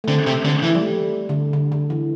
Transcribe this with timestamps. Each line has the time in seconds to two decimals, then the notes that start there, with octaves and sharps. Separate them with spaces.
0.04 A3
0.08 D3 C4
0.27 C3
0.45 D3
0.62 E3
0.75 G3
0.82 A3
1.29 D3
1.53 D3
1.72 D3
1.90 E3